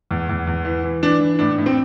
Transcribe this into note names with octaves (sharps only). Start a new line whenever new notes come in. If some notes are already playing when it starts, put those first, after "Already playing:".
E2
E2
E2
E3
E3
E3 D4
E3
A2 D4
A2
C4